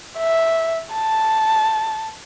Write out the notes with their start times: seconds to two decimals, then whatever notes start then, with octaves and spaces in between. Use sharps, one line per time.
0.18 E5
0.94 A5